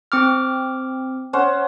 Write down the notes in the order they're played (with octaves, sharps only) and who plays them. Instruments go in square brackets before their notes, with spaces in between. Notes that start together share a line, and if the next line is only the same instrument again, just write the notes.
[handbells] C4 D6 F6
[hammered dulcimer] C#4 C5 F#5